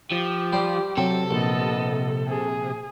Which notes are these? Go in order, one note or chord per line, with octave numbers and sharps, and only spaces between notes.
F3 G4
G3 C5
C3 F#3 C4 A4
A#1 B3 D#5
G#4